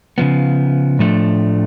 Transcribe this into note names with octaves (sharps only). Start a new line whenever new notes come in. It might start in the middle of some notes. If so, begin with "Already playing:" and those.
C#3 F3 B3
A2 F3 A3 D4